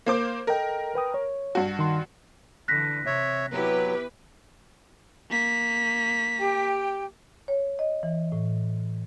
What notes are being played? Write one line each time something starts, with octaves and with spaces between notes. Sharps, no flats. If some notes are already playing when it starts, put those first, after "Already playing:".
A#3 C5 D6
A4 A#4 D#5 G5
B4 G5 D#6
C#5
G2 F#4
D#3 C6
D3 E3 F#6 A#6 B6
C3 C#5 E5
F#3 B3 E4 G4 B4
A#3 B6
G4 G5
C#5
D#5
E3
A2